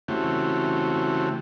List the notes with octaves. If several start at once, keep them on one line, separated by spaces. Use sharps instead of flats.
C#3 E3 A3 C4 F#4 G4